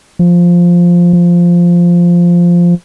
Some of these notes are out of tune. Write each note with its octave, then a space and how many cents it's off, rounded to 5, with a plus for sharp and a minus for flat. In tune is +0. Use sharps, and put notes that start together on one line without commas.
F3 +0
F3 -5